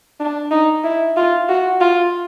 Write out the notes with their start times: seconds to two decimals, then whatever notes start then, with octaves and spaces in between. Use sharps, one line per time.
0.20 D4
0.51 D#4
0.84 E4
1.17 F4
1.49 F#4
1.81 F4